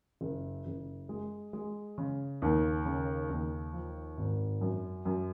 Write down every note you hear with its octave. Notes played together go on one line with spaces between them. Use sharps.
F#1
F#1
G#3
G#3
C#3
D#2
C#3
D#2
F3
G#1
F#2
F#2